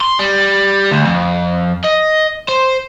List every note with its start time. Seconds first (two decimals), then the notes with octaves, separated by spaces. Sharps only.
0.01 C6
0.19 G3
0.91 D2
1.06 F2
1.84 D#5
2.49 C5